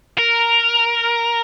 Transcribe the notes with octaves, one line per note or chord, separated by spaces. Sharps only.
A#4